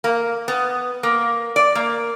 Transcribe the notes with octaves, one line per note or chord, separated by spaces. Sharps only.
A#3
B3
A#3
D5
A#3